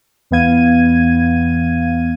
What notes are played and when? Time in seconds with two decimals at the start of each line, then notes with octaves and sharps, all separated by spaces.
0.31 E2 E3 B3 F5 G#6 D#7